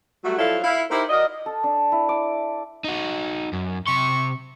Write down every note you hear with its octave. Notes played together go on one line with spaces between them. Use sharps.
F#3 G3 A3 F#4
F3 F#3 E4 A4 D5 F5
E4 F5
D#4 E4 G4 A#4 C5
F#4 A#4 D5 D#5
A4
D4
E4
D6
D#4 F#4
F#2
C3 C6 C#6